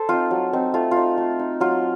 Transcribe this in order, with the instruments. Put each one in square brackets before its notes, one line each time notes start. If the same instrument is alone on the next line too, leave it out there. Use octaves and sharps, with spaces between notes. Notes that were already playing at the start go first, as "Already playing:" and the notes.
Already playing: [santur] A4 C5
C4 D#4 F4
F#3
C4 D#4
A3 F4
F4
D#4
A3
D#4
F#3 F4